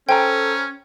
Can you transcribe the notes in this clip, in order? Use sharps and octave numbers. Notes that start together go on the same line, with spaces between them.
C#4 A4 C5 G5 G#5 A#5